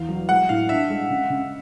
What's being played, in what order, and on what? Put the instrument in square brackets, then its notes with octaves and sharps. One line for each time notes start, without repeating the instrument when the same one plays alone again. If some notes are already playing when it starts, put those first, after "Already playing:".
Already playing: [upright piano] E2 [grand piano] F5
[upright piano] F#3
[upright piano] G#3 [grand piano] F#5
[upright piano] A2 [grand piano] F5
[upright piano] D4 [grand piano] E5
[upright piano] G#3
C#3
C#3